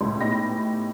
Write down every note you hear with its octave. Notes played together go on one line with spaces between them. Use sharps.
C#2 A2
A2 B3 D#4 G4 B5 A#6